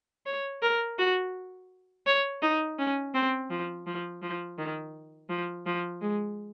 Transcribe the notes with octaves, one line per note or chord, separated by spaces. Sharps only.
C#5
A#4
F#4
C#5
D#4
C#4
C4
F3
F3
F3
D#3
F3
F3
G#3